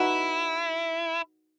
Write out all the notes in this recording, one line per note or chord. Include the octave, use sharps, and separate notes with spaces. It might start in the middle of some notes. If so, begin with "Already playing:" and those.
Already playing: D#4 E4 F#4 B4 F#5